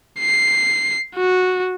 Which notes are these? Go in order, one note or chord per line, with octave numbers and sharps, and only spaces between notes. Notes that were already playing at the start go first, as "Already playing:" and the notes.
C7
F#4